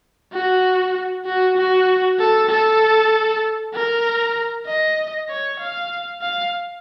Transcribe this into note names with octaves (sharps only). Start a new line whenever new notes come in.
F#4
F#4
F#4
A4
A4
A#4
D#5
C#5
F5
F5